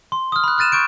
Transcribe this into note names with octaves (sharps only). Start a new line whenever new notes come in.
C6
D#6 F6
B5 F#6
F6 F#6 A6 D#7 E7
C#6 G6 D7